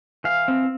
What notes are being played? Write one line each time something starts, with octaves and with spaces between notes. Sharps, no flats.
E3 F5
C4